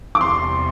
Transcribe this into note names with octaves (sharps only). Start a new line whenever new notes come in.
D6
E2 C3 G3 C6